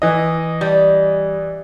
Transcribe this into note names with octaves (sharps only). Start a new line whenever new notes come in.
E3 D#5
G3